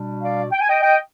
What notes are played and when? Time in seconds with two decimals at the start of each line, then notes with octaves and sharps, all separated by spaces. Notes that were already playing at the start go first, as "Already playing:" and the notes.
Already playing: B2 G3 D4
0.22 D5 F5
0.52 G5
0.61 G#5
0.69 D#5 G5
0.82 D#5 G5